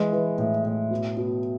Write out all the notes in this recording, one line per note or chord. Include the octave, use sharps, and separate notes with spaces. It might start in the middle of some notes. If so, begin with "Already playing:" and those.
Already playing: E3 G#3
E3
A2
A2
B2
B2